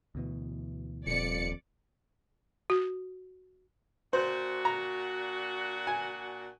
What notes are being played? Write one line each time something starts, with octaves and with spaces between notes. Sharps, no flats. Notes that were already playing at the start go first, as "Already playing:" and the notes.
D2 B2 E3
D#1 F2 D5 C#7
F#4
A#2 D4 F#4 C5
A#5
G#5